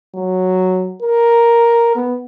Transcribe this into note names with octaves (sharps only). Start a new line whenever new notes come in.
F#3
A#4
B3